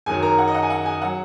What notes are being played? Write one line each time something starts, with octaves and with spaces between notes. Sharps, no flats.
F#2 D#3 F#3 G#4 G#5
A#4 A#5
F#5
D#5
F#5
G#5
F#5
G#4 G#5
F#3 F#5